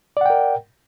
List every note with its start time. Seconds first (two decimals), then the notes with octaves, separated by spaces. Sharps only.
0.17 D5
0.21 F#5
0.26 G5
0.30 A#4